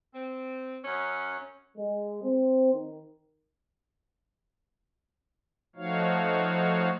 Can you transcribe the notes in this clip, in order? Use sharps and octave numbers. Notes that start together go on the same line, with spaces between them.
C4
F#2 C#4
G#3
C4
D#3
F3 A3 D#4 F#4 C#5 F5